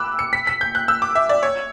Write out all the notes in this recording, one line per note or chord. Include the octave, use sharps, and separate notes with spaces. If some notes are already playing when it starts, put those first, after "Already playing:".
Already playing: B5 D6 E6 F#6
C#7
B6
B6
G6
F#6
E6
D6
E5
D5
C#5